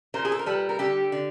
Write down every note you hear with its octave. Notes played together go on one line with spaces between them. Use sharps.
A#2 A#4 C5
G#4
A4
A#4
G3 A4 B4
A#4
D3 G4 A4
D3